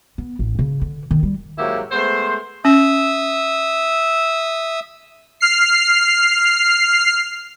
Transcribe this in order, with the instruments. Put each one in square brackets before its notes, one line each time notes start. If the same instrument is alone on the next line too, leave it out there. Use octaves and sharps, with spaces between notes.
[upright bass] B3
A1
C#3
D3
D#3
G3
[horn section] G#2 F#3 A#3 E4 F#4 G4
G#3 A3 B3 C5
[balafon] C#4 [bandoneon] E5 D#6 E6
[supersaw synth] F6 C7